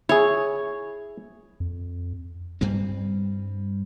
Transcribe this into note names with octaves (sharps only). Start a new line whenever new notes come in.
E4 G#4 C#5
F2
G2 G3 C4